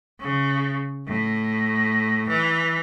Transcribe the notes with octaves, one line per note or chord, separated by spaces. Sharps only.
C#3
A2
E3